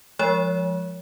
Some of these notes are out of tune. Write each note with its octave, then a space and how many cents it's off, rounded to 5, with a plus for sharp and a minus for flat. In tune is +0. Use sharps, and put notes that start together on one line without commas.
F3 +0 G#3 +0 C#5 +20